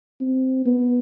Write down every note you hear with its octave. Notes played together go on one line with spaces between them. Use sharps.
C4
B3